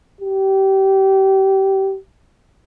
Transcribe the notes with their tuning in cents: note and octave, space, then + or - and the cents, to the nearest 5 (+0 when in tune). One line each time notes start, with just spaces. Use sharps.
G4 -25